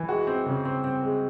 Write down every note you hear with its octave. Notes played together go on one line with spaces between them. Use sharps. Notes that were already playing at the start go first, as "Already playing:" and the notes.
Already playing: E3
G#3 F#4
C4
C#3
C4
C4
G#3